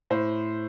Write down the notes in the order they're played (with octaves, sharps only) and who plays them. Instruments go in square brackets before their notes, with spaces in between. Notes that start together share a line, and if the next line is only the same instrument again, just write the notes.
[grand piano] A2 C5